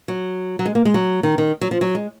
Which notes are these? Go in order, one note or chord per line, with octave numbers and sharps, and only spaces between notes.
F#3
F#3
G#3
A#3
G#3
F#3
D#3
D#3
F#3
F3
F#3
G#3